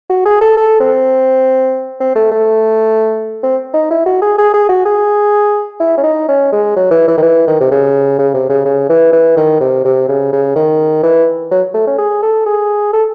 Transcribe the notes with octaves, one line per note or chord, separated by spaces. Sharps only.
F#4
G#4
A4
A4
C4
C4
A3
A3
C4
D#4
E4
F#4
G#4
G#4
G#4
F#4
G#4
E4
C#4
D#4
C#4
G#3
F#3
E3
E3
D#3
E3
D#3
C3
C#3
C#3
C3
C#3
C#3
E3
E3
D#3
C3
C3
C#3
C#3
D#3
E3
F#3
A3
C#4
G#4
A4
G#4
A4